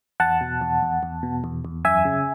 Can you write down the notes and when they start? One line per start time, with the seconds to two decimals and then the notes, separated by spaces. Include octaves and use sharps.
0.20 E2 F#5 A5
0.41 B2
0.61 E2
0.83 E2
1.03 E2
1.23 B2
1.44 E2
1.65 E2
1.85 F#2 E5 G#5
2.05 C#3